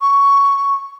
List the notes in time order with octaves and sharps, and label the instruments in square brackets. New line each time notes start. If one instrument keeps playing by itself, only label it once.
[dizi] C#6